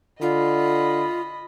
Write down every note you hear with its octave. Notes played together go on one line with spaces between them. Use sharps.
D3 F4 D#5 B5